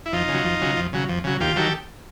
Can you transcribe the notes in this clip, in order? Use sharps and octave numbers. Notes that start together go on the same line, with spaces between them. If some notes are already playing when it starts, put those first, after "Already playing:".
E4
F2 D#4 F4
C#3
F#3
F2
C#3 F#3
F2
C#3 F#3
F2
C#3 F#3
D#2 F4 G4
D#3 F#3 G4 A4